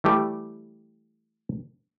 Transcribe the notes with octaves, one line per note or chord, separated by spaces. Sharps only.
E3 G3 A3 G4